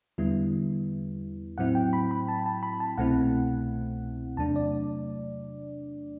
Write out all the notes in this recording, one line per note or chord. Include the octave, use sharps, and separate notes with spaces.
E2 D3 G3 B3 E4
A2 F#3 C4 E4 F#5
G5
B5
B5
A5
A5
B5
A5
C2 B2 A3 C4 E4 F#5
E2 C3 F#3 A3 D4 A5
D5